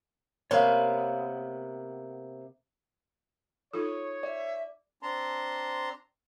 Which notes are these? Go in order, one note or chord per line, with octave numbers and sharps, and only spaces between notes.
C3 A#3 B3 C#5 F5
D#4 F4 A4 C#5 D#6
D5 E5
C4 D4 A5 A#5 C6